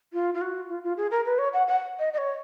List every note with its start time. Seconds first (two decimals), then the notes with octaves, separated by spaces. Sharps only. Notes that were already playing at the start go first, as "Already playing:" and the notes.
0.13 F4
0.34 F4
0.41 F#4
0.69 F4
0.84 F4
0.97 G#4
1.11 A#4
1.25 B4
1.39 C#5
1.53 F#5
1.68 F#5
1.99 D#5
2.13 D#5
2.18 C#5